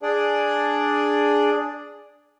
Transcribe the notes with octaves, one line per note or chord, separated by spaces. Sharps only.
D4 G#4 D5